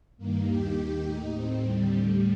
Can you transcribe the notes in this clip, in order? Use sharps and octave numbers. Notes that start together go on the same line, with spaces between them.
G2 D#3 A#3
D#2 D#3 G4
D#2 D#3
A2 D#4
A2 C4
D#2 D3 G3
A2